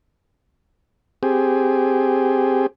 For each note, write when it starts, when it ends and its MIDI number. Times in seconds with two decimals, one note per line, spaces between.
1.23 2.67 60
1.23 2.67 67
1.23 2.67 68